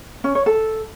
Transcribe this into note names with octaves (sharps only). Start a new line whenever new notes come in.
C#4
C#5
A4